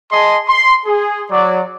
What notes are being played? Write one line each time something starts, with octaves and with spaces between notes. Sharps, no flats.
G#4 D#5 A5 C6
C6
G#4
F#3 D5